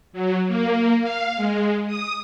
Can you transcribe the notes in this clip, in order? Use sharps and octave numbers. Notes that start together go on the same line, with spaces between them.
F#3
A#3
F5
G#3
D#6